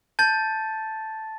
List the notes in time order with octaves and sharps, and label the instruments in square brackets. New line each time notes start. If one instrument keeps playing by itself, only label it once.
[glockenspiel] A5 A6 [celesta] G6